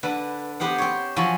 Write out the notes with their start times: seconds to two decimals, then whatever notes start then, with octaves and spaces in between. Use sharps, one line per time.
0.03 D3 B4
0.60 B3 G4 C5 F#5
0.78 C4 C#5
1.16 F3 F#3 C#5 G#5 B5